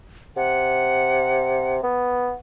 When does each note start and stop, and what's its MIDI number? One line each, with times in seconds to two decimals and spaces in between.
0.36 1.80 48
0.36 1.76 78
1.83 2.34 59